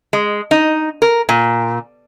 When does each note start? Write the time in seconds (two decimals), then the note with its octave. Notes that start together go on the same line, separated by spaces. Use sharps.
0.13 G#3
0.51 D#4
1.02 A#4
1.29 A#2